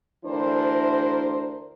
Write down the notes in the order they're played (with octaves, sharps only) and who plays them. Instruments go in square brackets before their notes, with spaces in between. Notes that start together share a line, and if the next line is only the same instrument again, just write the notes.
[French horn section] D2 E3 D4 E4 A#4 C5